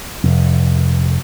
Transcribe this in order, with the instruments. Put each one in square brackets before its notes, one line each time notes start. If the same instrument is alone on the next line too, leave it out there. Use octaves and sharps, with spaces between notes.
[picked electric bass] F1